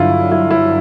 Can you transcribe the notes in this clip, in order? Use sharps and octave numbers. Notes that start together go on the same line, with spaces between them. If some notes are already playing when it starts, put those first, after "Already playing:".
Already playing: G2 D3 F#3 E4 F4
E4
E4